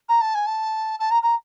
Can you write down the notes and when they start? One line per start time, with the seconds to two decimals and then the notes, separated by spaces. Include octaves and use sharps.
0.09 A#5
0.21 A5
0.35 G#5
0.46 A5
0.99 A5
1.11 A#5
1.23 A#5